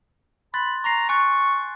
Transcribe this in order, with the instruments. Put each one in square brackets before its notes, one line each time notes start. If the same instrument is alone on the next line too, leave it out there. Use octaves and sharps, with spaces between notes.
[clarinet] B5 [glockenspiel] C6 F#6 A6
[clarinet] A#5 [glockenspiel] C#6 C7
[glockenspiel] G#5 F#6 A6 [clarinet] C#6